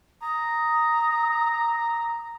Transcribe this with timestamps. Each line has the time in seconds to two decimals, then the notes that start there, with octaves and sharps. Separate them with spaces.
0.22 A#5 D#6